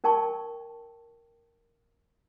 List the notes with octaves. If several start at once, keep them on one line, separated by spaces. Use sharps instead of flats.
D#4 A#4 G5 A5 C#6